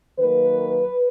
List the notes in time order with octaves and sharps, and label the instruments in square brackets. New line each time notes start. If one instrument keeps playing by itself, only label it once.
[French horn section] D#3 F#3 A#3 B4